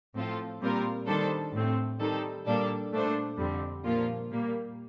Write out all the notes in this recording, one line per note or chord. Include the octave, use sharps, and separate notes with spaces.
A2 F3 C4 F4 A4
A#2 G3 C4 F4 A#4
D#3 G3 D4 A4 C5
A2 A3 C4
D#3 G3 C4 D#4 A4
A#2 G3 A#3 D4 A4
A#2 A3 D4 A4 C5
F2 D3 G3 C4
A#2 F3 A#3 F4
A#2 G3 A#3